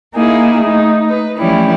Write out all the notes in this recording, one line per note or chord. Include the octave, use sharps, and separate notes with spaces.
A#3 D#4 E4 G#4
A3 D#4
B4
E3 F3 G3 A3 C#4 E4